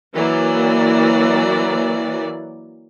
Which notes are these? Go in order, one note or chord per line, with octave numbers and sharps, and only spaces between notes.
E3 F#3 A#3 D5